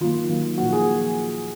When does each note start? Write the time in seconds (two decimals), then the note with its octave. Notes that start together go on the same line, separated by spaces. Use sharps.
0.01 D#3 F#3 A#3 F4
0.29 D#3 F#3 A#3
0.58 A#2 F3 A#3 F#4
0.73 G#4